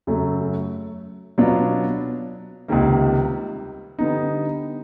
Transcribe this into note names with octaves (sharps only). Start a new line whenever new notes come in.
F#2 C#3 F#3 A3
B2 F#3 B3 D4 F4
C#2 C3 D#3 G3 A#3
D3 G3 B3 D#4